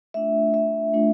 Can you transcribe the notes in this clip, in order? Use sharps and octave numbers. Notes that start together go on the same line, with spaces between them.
A3 D4 F4 E5
E5
A3 D4 F4